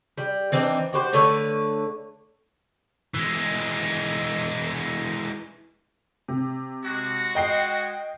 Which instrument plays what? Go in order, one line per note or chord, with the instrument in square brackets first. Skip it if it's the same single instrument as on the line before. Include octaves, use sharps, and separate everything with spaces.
[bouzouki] G3
E3 C4 D4 D#4
F#4 G4 B4 C5
D3 A3 B4 C#5
[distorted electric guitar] E3 G#3
[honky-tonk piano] C3
[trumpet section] G#3 F#4
[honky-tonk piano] D#5 G5 C7